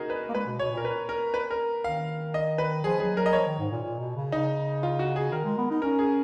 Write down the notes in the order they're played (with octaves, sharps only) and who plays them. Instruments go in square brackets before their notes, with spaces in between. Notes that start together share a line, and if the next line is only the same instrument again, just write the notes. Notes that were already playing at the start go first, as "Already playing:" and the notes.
Already playing: [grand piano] D#4 F#4 G#4 A#4
B4
[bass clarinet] A#3
[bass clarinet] G#3 [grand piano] B4
[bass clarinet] B2
[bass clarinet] B2 [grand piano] C#5
[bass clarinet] A#2
[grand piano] A#4
B4
A#4
B4
A#4
[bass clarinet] D#3 [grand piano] F5
[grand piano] D#5
B4
[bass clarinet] F3 [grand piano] G#4
[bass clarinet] F#3 [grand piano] G#4
[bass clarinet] F#3 [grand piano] A#4
[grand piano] D#5
[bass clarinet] F3 [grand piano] C#5
[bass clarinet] D#3
G#2
A#2
A#2
B2
C#3
[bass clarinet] C#3 [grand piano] D#4
[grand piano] F4
F#4
G#4
[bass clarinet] D#3 [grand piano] A#4
[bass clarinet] G#3
B3
D#4
[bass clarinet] C#4 [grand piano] A#4
[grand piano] G#4